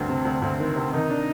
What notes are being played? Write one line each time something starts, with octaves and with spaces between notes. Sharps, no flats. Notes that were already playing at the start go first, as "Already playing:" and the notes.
Already playing: D2 G2 C4
C3
D2
D2 C4
D#3
C3
D#3 D#4
D4